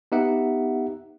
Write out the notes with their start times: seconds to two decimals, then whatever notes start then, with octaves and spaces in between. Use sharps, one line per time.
0.12 B3 D#4 G4 E5 F#5